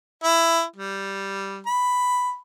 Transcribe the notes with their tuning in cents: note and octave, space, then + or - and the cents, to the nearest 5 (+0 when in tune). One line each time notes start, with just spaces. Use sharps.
E4 +15
G3 -5
B5 +5